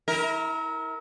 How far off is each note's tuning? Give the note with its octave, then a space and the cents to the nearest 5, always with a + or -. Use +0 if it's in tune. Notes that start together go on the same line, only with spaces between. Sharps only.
E4 -35 A#4 +0